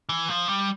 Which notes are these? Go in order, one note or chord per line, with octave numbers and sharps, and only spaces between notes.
E3
F3
G3